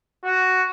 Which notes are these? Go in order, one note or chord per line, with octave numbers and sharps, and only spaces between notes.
F#4